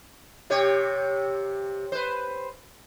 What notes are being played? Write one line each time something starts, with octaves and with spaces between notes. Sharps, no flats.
C3 G4 C#5
B4 C5